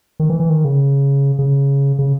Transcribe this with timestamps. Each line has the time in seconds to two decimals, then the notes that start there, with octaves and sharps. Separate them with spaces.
0.20 D#3
0.30 E3
0.40 E3
0.50 D#3
0.65 C#3
1.39 C#3
1.99 C#3